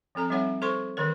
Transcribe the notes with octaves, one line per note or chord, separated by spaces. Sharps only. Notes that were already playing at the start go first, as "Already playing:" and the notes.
F3 C4 A4 A#5
G3 C4 D#4 C#5 E5 F#5
A4 C5 C6 C#6
D#3 E3 A#4 C#5